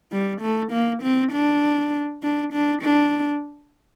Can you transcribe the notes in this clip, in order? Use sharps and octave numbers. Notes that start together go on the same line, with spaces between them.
G3
A3
A#3
C4
D4
D4
D4
D4